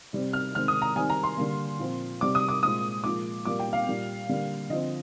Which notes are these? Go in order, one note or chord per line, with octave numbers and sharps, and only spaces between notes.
C3 G3 C4
F6
C3 D#3 G#3 C4 F6
D#6
A#5
D#3 G3 C4 G#5
A#5
C6
D3 G3 A#3
A#2 F3 C4
C3 G3 C4 D6
D#6
D6
A#2 G#3 C4 D#6
A#2 F3 G#3 D6
A#2 G3 A#3 D6
G5
F5
A#2 G3 A#3
D3 G3 A#3
D3 F3 C4 D#5